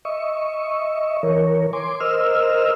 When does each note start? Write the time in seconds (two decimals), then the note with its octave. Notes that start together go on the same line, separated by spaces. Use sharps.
0.05 D#5 E5 C#6
1.23 E3 A#4 C#5
1.73 G#5 C6 D6
2.00 A#4 C5 D#5 E6 F6